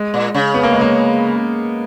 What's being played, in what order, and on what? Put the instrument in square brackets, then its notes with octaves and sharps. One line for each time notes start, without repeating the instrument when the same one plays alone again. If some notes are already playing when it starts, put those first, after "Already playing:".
Already playing: [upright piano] G#3
[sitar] A#2
C#3
[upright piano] B3
A#3
G#3
A#3